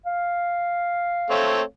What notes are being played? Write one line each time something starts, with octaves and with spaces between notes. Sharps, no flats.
F5
A3 C4 C#5